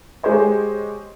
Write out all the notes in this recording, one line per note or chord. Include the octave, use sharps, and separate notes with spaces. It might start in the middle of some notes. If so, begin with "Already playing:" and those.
G#3 G4 C5 C#5 D#5